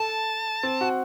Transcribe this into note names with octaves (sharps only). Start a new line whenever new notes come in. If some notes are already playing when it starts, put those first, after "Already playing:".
Already playing: A4 A5
C4
F#4